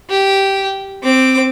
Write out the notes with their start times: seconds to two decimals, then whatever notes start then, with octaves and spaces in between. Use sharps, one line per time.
0.10 G4
1.03 C4 D6